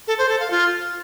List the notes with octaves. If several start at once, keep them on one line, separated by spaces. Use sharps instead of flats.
A4
C5
A4
F5
F4